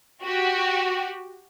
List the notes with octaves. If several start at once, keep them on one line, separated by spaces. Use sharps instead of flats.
F#4 G4